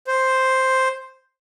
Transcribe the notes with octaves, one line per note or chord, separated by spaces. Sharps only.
C5